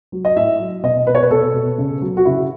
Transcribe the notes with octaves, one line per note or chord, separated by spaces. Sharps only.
F#3
D#5
A2 E5
F#3
B2 D#5
B2 B4
C#5
B4
B2 A4
B2
C#3
F#3
F#4
C#3 E4